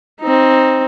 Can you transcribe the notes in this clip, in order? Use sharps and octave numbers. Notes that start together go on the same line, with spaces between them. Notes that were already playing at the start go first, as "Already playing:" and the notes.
C4 D#4